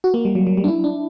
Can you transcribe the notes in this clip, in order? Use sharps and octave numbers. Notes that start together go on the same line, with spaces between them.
F#4
A#3
G3
F#3
F#3
G3
D4
E4
D4